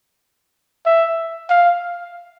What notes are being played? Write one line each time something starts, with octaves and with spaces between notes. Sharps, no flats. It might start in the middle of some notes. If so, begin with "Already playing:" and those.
E5
F5